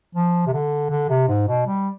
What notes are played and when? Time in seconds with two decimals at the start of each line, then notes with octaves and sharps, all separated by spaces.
0.15 F3
0.47 C3
0.53 D3
0.91 D3
1.09 C3
1.28 G#2
1.48 B2
1.67 G3